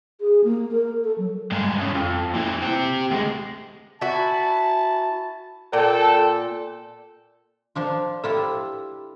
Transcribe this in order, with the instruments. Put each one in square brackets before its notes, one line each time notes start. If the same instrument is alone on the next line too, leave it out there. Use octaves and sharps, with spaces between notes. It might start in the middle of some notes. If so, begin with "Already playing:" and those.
[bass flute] G#4
A#3
A#4
A4
F#3
[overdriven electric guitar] G2 G#3
G2 C#3
F2
A#2 E3
C4 G4
D2 G#3
[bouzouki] E4 F#4 [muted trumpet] A5
[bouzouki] A#2 [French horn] A4 [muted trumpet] G5
[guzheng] F3 D4 F4
[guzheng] E4 F4 G4 [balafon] A4